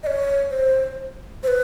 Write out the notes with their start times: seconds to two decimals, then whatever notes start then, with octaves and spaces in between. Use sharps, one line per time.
0.03 D#5
0.07 C#5
0.51 C5
1.43 C5
1.48 B4